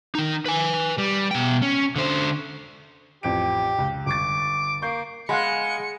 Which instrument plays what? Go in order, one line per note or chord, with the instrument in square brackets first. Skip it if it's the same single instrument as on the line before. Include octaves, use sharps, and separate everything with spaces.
[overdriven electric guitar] D#3 D#4
B4 G#5
G3
B2 G5
C#4
D3 C5
[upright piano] A1 F2 D7 [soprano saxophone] G4
[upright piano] C#2
[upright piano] G1 C#6 A6 [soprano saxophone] D6
[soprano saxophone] A#3 [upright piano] C#6 G6
[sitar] G#3 [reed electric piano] F5 F#5 B5 [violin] C#7